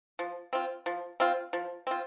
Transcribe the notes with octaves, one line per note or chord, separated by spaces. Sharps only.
F3
C4 F4
F3
C4 F4
F3
C4 F4